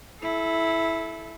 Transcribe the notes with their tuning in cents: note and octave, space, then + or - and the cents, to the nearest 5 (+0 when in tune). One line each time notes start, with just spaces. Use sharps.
E4 +0 A4 -25